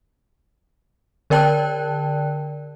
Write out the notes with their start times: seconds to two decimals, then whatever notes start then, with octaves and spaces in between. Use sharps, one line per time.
1.30 D3 A#4 D5 G5 A5 F#6